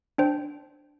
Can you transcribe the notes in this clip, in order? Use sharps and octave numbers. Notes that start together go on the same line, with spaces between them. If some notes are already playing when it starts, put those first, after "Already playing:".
D4 C5 G5